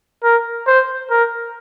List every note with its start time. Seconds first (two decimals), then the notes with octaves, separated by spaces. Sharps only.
0.23 A#4
0.67 C5
1.10 A#4